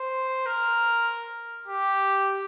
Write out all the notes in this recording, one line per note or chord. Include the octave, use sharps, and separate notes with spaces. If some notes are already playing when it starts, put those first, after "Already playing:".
Already playing: C5
A#4
G4